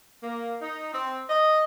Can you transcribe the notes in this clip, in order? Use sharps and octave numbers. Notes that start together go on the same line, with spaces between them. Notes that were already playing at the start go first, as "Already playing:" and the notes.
A#3
D#4
C4
D#5